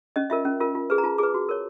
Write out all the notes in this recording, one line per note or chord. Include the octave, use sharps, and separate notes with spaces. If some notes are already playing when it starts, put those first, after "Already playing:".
C#4 D#5
F4 A#4 E5
C#4
F4 A#4
F4
G#4 B4
A#5
F4 A5
G#4 B4 D6
F#4
A#4 C#5